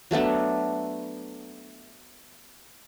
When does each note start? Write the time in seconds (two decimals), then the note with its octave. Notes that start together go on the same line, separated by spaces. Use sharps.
0.11 F#3 A3 B3 D4